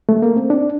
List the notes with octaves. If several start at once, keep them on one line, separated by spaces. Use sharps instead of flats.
A3
A#3
C4
D4